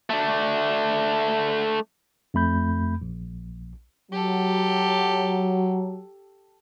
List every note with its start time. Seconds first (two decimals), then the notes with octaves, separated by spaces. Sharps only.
0.10 A3 D4
2.34 F2 A3 B5 G6
3.02 A#1
4.12 F#3 G4 A4